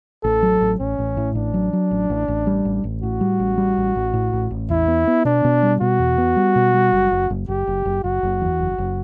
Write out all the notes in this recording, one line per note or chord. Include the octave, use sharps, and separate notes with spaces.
A1 A4
F#3
A1
A1 C#4
A1
A2
A1 D4
F#3
F#3
A1
A1
A1
G3
A1
A1
A2 F#4
G3
A1
G3
A1
A1
A2
A1
A1
E2 E4
B3
B3
B2 D4
B2
G3
B2 F#4
E2
B3
G3
B2
G3
F#1
F#1
F#1
F#1 G4
F#1
F#1
F#1 F#4
F#1
E2
F#1
F#1